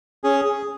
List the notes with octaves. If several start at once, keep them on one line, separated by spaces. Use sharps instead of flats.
C#4 G#4
G#4